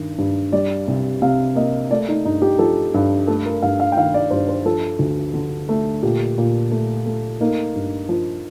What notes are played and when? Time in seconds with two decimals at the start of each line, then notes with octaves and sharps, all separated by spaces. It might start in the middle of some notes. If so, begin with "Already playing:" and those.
Already playing: G2 D#3
0.18 G2
0.52 G3 D5
0.88 C2
1.22 C3 F5
1.55 A#3 D#5
1.91 A3 D5
2.08 D#4
2.25 G2 D#4
2.42 G4
2.59 F3 A4
2.94 G2
3.27 A3 A4
3.46 A#4
3.62 G2 F5
3.80 F5
3.92 G5
3.97 D#3 F5
4.14 D5
4.30 G2 C5
4.49 C5
4.65 F3 A4
4.99 D2
5.34 D3
5.69 A3
6.03 A#2 G4
6.38 A#2
6.71 A3
7.06 A3
7.41 A#3 D#4
7.75 G2
8.09 F3